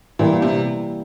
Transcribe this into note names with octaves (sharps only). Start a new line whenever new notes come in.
A#2 E3 G3 A#3
C3